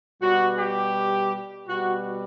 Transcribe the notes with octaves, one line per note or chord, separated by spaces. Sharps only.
B2 G3 F#4
G4
B2 G3 F#4